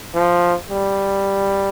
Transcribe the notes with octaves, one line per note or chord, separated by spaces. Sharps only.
F3
G3